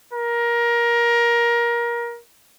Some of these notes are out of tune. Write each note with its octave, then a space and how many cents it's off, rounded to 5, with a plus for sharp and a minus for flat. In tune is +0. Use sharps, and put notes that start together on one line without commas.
A#4 +20